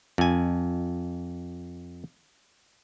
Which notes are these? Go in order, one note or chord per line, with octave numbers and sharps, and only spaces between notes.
F2 G#5